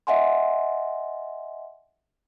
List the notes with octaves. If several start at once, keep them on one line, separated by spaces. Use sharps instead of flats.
D#5 E5 F#5 G#5 C6